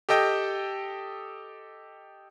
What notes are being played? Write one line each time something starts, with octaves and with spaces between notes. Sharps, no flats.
G4 A4 D#5 G5